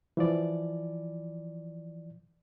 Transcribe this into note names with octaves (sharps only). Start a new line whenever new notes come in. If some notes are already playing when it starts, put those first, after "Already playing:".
E3 F3 D5